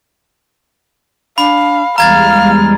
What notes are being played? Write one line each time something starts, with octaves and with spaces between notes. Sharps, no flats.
D4 F5 B5
E2 G3 G#3 F5 A#5 F6 G#6 A6